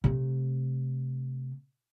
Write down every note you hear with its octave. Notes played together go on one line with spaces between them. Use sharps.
C3 A3